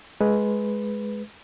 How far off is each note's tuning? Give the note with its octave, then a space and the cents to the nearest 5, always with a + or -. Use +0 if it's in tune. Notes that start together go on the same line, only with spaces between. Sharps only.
G#3 +10 B4 +0